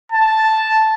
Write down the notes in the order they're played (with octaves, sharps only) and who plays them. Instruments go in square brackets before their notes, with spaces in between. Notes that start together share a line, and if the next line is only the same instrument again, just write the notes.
[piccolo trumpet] A5